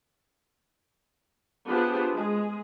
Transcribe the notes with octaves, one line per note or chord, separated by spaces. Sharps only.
B3 D4 F4 G4 G#4 C5
G#3 G#4